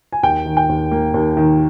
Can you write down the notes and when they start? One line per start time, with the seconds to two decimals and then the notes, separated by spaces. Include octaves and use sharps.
0.13 G#5
0.23 D#2 G5
0.46 D#3
0.57 G5
0.69 D#2
0.91 A#3
1.14 D#2
1.37 D#3